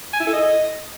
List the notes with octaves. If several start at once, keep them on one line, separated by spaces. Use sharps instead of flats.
G#5
E4
A4
D#5